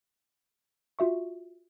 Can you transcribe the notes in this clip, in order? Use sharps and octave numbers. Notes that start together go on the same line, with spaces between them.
F4 F#4 E5 C#6